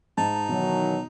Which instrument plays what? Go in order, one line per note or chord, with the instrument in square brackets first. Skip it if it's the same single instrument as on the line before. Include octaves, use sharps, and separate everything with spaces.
[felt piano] G#2 [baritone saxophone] D#4 [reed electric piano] A5
[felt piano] B2 [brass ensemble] D#3 E3 F#3